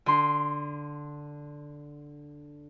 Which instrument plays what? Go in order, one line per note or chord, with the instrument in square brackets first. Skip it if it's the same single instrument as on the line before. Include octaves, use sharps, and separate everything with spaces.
[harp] D3 C6